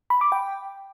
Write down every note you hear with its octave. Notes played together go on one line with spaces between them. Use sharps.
B5
D6
G5